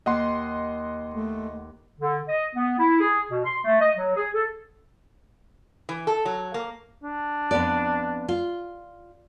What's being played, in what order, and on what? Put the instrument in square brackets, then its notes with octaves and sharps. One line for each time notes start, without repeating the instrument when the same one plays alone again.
[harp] D#2 [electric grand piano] D#5 F#5 C6
[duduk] A3
[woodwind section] D3
D#5
B3
E4
G#4
B2
C6
A3
D#5
F#3
G#4
A4
[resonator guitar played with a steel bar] E3
A4
F#3
A#3
[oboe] D4
[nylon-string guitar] F2 B3 D5
F4